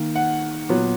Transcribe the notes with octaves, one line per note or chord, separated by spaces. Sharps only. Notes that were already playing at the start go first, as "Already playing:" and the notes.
Already playing: D#3 A#3
F#5
A#2 F#3 B3